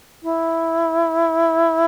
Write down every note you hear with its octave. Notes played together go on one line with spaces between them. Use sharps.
E4